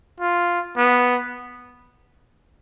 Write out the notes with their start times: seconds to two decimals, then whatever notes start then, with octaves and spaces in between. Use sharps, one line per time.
0.20 F4
0.77 B3